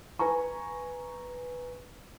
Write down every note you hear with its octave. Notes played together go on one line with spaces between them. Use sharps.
B4 G#5 A#5 C#6